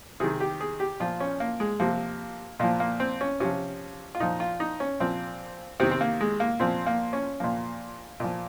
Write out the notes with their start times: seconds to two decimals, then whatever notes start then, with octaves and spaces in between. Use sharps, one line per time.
0.20 C3 D#3 G#4
0.40 G4
0.60 G#4
0.80 G4
1.00 A#2 F3 F4
1.20 C#4
1.40 A#3
1.60 G#3
1.80 C3 F3 A#3
2.60 A#2 F3 A#3
2.80 A#3
3.00 C4
3.21 C#4
3.40 C3 F3 C#4
4.15 F4
4.20 A#2 F3 D#4
4.40 F4
4.60 D#4
4.80 C#4
5.00 A#2 F3 C4
5.80 C3 C4
5.83 D#3
5.91 C4
6.01 A#3
6.21 G#3
6.40 A#3
6.60 A#2 F3 C4
6.87 A#3
7.13 C#4
7.40 A#2 F3 A#3
8.20 A#2 F3